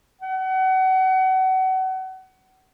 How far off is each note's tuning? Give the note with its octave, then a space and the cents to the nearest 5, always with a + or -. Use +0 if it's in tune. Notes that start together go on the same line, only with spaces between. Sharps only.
F#5 +30